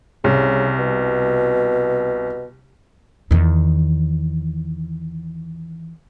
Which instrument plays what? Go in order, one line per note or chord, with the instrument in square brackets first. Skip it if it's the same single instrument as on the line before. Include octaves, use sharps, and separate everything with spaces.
[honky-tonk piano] C2 [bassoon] C#3
[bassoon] B2
[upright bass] E2 D#3